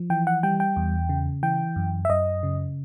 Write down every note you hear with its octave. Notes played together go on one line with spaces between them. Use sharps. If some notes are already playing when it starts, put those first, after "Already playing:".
Already playing: F3
E3 G5
F#5
G3 G5
G5
E2
C#3
E3 G5
F#2
E5
F#2 D#5
C#3